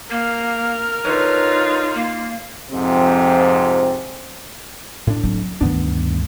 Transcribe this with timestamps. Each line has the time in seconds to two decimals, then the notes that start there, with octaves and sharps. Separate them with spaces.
0.10 A#3 A#4 F6
1.05 D3 D#4 F4 B4 C#5
1.94 A#3
2.71 F2 G#2 C3 F3 C4
5.07 A2 D4
5.23 F#3 C4
5.61 D2 G2 D#3 B3 D4